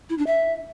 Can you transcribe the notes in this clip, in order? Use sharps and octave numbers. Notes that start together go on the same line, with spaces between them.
E4
D4
E5